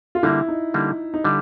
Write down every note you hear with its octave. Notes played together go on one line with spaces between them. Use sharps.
F4
D3 G3 A#3 E4
D#4
D3 G3 A#3
D#4
D3 G3 E4